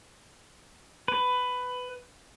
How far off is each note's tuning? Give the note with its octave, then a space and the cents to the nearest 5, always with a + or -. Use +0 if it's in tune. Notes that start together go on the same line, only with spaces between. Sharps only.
B4 +15